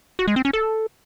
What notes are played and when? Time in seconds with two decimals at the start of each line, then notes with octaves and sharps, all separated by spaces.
0.19 F#4
0.28 G#3
0.36 C4
0.45 C#4
0.53 A4